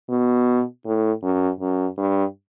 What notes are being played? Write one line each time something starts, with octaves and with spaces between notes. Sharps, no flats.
B2
A2
F#2
F#2
G2